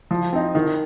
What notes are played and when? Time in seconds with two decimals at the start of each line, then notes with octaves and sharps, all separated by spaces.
0.11 F3
0.33 C4 D#4
0.55 D#3